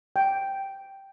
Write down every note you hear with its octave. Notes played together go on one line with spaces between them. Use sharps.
G5